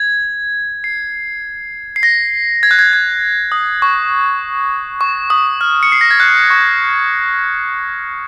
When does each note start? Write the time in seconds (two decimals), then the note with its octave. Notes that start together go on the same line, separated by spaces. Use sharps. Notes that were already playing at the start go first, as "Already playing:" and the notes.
Already playing: G#6
0.84 C7
1.96 C7
2.03 A#6
2.63 G#6
2.71 F#6
2.79 G#6
2.93 G#6
3.52 D#6
3.82 C#6
5.01 C#6
5.30 D#6
5.61 F6
5.83 C#7
5.92 C7
6.01 A#6
6.11 G#6
6.20 F#6
6.50 C#6